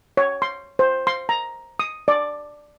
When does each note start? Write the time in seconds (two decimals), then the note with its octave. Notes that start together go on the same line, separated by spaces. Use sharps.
0.17 C#5
0.42 C6
0.79 C5
1.07 C6
1.29 A#5
1.79 D#6
2.08 D5